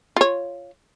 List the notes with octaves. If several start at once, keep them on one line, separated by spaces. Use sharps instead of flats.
F4 C#5